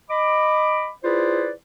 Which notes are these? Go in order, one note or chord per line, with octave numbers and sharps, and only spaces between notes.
D#5 B5 D6
E4 F4 G#4 B4 C5 D5